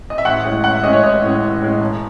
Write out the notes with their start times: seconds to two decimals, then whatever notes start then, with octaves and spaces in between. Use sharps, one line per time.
0.10 D#5
0.18 E5
0.25 A1 F#5
0.45 A2 G#3 C#4
0.64 A1 F#5
0.73 E5
0.83 A2 G#3 C#4 D#5
0.93 C#5
1.03 A1 D#5
1.22 A2 G#3 C#4
1.42 A1
1.61 A2 G#3 C#4
1.80 E1